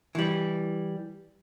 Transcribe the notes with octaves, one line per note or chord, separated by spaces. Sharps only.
E3 G3